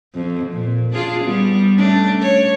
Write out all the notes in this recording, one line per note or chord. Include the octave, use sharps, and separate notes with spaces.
F2
A#2
D4 F4 G#4
G3 B3
A3 C#4 D4
C#5